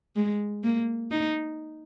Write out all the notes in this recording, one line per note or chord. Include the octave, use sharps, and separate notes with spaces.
G#3
A#3
D#4